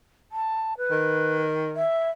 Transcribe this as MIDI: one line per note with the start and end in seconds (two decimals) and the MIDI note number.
0.32 0.74 81
0.78 1.43 71
0.91 1.84 51
1.76 2.09 76